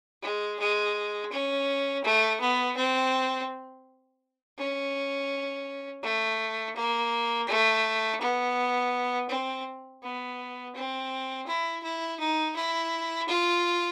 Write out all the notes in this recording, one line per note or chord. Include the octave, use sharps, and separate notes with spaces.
G#3
G#3
C#4
A3
B3
C4
C#4
A3
A#3
A3
B3
C4
B3
C4
E4
E4
D#4
E4
F4